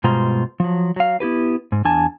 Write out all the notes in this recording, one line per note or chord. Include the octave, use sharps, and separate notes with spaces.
G2 B2 G#3 F4 C5 A#5
F3 F#3
F#3 F5
B3 E4 G4 B4
G#2
E2 D4 G#5 A5